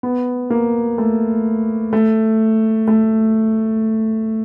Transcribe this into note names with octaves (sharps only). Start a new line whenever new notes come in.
B3
A#3
A3
A3
A3